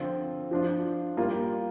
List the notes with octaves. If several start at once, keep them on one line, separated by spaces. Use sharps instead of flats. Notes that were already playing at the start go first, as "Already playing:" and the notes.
Already playing: D3 F3 C4 F4
F3 D4 F4
G3 A#3 F4